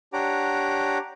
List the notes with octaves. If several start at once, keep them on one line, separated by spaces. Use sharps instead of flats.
D4 G4 C#5 F#5 A#5 D6